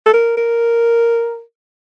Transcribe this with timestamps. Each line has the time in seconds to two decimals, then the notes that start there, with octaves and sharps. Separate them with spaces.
0.06 A4
0.14 A#4
0.37 A#4